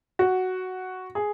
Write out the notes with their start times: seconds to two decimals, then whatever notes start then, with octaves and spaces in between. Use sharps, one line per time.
0.19 F#4
1.15 G#4